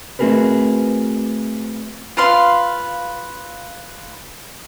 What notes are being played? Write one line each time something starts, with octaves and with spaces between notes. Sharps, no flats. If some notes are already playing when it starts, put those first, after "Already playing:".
A3 C4 F#4 G#4 A#4 B4
F4 B4 F5 C6